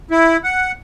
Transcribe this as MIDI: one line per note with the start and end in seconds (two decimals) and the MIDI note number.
0.11 0.37 64
0.44 0.72 78